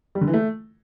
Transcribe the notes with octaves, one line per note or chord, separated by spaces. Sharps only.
G3
D3
E3
A3